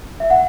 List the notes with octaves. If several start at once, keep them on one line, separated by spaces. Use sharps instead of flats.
E5
F#5